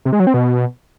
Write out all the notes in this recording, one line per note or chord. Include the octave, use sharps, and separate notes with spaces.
C3
G#3
F#3
C4
B2